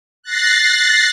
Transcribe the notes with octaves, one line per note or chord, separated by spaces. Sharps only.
F#6 A6 A#6 C7